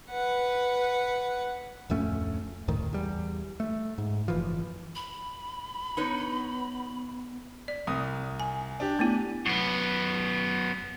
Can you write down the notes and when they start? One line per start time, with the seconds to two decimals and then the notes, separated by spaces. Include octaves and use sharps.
0.11 B4 F#5
1.90 D1 F2 A3 C#4
2.68 F1 D2 A2 D#3
2.93 E2 G3
3.60 A3
3.98 G#2
4.28 F#1 E3 F3
4.95 B5
5.97 B3 D#4 B4 C#5
7.68 D5
7.87 C2 D#6
8.40 G#5
8.80 D4 G4
8.99 A3 B3 E4
9.46 F#2 B3